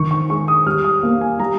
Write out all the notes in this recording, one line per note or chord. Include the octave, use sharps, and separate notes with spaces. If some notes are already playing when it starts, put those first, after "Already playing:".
Already playing: D#3 C#6
C#6
G#3 C#6
D#6
G3 F6
D#6
A#3
G#5
G3 A#5